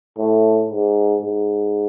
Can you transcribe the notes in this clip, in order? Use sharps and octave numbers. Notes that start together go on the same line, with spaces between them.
A2
G#2
G#2